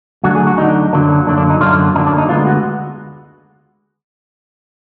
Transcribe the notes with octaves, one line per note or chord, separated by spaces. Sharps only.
D2 D3 F#3 D4 F#4
G#4
F#4
D2 D3 F#3 D4 D#4
F#2 D3 F#3 A#3 D4
F#2 D3 F#3 A#3 D4
D4
D#4
F#2 D3 F#3 A#3 D4 F4
F#2 D3 F#3 A#3 D4 D#4
D4
D#4
D2 D3 G#3 B3 D4 F4
F#4